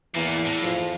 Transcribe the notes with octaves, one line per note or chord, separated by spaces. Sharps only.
E2 A#2 E3
A2
F2 F3